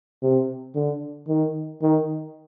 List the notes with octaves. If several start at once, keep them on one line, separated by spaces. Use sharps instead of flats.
C3
D3
D#3
D#3